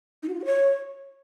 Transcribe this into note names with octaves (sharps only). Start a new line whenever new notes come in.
D#4
F#4
F4
F#4
C#5